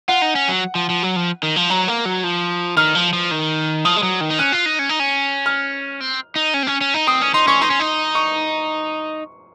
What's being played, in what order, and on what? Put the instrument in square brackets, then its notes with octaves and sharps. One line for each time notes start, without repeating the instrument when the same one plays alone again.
[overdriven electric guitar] F4 [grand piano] F#5
[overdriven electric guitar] D#4
C#4
F#3
F3
F3
F#3
F3
D#3
F3
[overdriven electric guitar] F#3 [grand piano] A#5
[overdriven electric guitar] A#3
F#3
F3
[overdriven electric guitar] D#3 [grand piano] F6
[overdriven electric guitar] F3
F3
D#3
[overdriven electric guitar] F3 [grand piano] D#6
[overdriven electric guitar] G#3
F#3
D#3
D#4
[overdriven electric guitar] C#4 [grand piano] F#6
[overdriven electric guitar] F4
D#4
C#4
D#4
C#4
[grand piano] F6
[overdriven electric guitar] C4
D#4
C#4
C4
C#4
C#4
D#4
[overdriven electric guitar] C4 [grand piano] D#6
[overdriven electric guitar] C#4
[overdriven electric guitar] D#4 [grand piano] C6
[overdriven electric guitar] C#4 [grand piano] C#6
[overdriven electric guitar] D#4 [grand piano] C6
[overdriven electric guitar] C#4
D#4
[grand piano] C#6